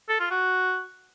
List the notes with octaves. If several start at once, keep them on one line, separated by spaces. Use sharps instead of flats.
A4
F4
F#4